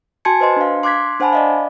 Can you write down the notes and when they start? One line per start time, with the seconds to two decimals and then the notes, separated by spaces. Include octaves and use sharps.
0.25 F#4 G#5 A5 C6 G#6 C#7
0.40 B4 C5 D#5 C6
0.57 D4 F5
0.83 C6 D6 F#6 G#6 B6
1.20 D4 C5 F#5 G#5 A5 B5
1.33 D5 D#5 F5